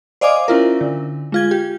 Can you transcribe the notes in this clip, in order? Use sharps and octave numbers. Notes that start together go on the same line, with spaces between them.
C5 D5 D#5 F5 G#5 D6
C#4 E4 F4 A#4
D3
G#3 F4 G#6
G4